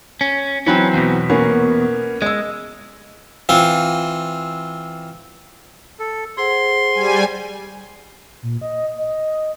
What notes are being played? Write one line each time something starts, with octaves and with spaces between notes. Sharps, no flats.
C#4
E3 F#3 C4 C#4 B4
E2 B2
A#3 B3 C#4
G#3 D#5 E6
E3 C4 F4
A4
G#4 C5 F#5 C6
G3 G#5
A#2
D#5
D#5